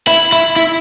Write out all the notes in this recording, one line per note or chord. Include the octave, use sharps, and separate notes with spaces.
E4
E4
E4